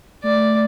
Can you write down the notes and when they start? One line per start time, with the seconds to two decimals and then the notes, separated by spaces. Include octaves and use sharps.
0.23 A3 D5